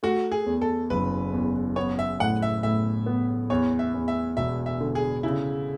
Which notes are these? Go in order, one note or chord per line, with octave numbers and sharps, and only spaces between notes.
A3 F#4
G#4
E2
A4
F#1 B4
E2
B3 C#5
E5
A2 F#5
E5
A2 E5
B3
E2 C#5
E5
E2
E5
E1 E5
E5
D3
G#4
C#3 E4